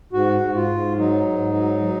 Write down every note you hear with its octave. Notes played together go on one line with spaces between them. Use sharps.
G#2 F#4
G#2
F4
G#2
F#3 D#4
G#2
F#3
F#3